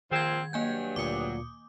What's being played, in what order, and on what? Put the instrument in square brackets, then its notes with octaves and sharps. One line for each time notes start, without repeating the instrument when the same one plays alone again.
[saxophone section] A#2 F3 C4 [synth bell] D#3 G#6
[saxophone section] G2 F#3 [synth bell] A#3 G#5 G6
[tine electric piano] D2 A#2 C#7 [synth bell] D6 D#6